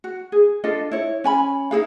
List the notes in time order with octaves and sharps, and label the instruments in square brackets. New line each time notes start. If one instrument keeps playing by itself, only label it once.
[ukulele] F#4
G#4
D4 F4 A4 D#5
E4 C#5
C#4 G#5 B5
D#4 E4 G#4 F5